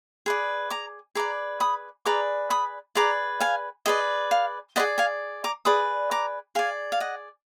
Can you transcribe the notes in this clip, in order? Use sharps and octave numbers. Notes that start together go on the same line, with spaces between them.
G#4 B4 D5
A#5 D6
G#4 B4 D5 A#5 D6
B5 D#6
G#4 B4 D5 A#5 D6
B5 D#6
G#4 B4 D5 A#5 D6
F5 G#5
G#4 B4 D5 D#5
F5
G#4 B4 D5 D#5 F#5
F5 G#5
A#5 D6
G#4 B4 D5 B5 D#6
A#5 D6
G#4 D5 F5 G#5
F5
D#5 F#5